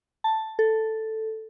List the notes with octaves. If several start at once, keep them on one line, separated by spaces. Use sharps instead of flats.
A5
A4